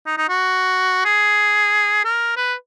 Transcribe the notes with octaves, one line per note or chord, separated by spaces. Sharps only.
D#4
D#4
F#4
G#4
A#4
B4